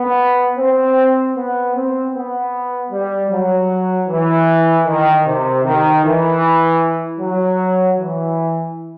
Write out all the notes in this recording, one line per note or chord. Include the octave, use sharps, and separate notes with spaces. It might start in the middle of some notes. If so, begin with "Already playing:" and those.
Already playing: B3
C4
B3
C4
B3
G3
F#3
E3
D#3
C3
D#3
E3
F#3
E3